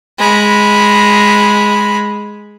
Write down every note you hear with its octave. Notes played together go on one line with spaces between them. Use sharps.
G#3 B5